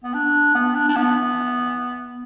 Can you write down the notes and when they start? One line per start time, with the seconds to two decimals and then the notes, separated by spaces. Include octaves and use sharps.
0.04 B3
0.14 D4
0.55 B3
0.75 D4
0.88 D4
0.96 B3